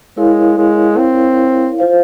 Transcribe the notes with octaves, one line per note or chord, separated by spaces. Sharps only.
G#3 E4 A#4 C#5 F5
G#3
C4
F4 C5 F5